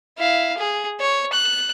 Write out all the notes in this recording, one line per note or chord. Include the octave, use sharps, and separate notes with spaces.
E4 F5
G#4
C#5
F#6